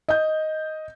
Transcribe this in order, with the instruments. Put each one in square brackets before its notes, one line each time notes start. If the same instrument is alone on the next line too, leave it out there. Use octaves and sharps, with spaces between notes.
[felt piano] D#5 G6